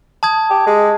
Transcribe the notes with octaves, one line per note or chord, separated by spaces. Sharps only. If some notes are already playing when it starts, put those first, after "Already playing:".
A5 D#6 G#6
G4
G#3